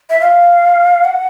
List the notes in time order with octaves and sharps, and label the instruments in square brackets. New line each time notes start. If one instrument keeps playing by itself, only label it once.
[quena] E5
F5
F#5